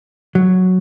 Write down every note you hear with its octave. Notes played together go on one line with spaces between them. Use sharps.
F#3